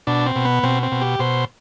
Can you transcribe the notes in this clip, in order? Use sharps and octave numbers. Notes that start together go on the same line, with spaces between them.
B2 D4
C4
B2
B3
B2 C4
C4
B2
G4
B2 C5